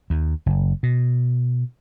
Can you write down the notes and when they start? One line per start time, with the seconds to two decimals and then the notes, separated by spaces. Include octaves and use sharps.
0.10 D#2
0.46 F#1
0.83 B2